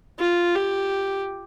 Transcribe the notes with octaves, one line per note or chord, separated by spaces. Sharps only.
F4
G4